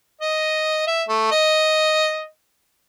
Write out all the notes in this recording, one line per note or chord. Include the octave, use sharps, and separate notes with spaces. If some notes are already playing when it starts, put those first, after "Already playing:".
D#5
E5
A3
D#5